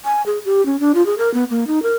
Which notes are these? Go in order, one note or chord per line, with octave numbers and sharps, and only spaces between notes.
G#5
G#4
G4
C#4
D4
F4
G#4
A#4
B3
A#3
D#4
A#4